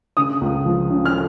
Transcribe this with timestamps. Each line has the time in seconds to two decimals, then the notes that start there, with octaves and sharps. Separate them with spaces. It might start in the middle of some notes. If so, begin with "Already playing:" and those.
0.17 C#3 D#6
0.41 C#2
0.66 F3
0.91 C#3
1.05 F6